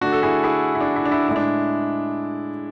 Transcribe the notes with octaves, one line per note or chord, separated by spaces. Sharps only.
D3 A3 D4 F#4
A4
E4 G#4
E4 G#4
E4
D4
E4
D4
E4
A2 G#3 D4 E4